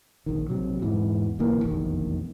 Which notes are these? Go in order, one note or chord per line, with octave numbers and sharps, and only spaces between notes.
A#1 D#3
A#1 C3 F#3
E2 G#2 E3
D1 B1 E3 A#3
F1 A#1 E2 D#3